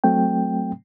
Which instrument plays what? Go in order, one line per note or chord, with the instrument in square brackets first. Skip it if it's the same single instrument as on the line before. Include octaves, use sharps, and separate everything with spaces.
[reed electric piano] F#3 A3 C4 G5